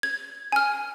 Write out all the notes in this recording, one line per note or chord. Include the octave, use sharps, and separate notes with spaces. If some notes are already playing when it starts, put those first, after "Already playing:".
G#6
G#5 F6